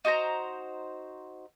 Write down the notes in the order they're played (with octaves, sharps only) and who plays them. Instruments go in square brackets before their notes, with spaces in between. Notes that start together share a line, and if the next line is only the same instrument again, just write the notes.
[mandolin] D#4 F#4 C5 A#5